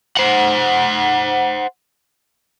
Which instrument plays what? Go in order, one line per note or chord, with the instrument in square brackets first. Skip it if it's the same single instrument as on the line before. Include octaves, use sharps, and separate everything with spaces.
[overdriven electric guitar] C5 F#5